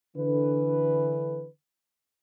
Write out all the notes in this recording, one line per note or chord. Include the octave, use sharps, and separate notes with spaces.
D3 E3 B4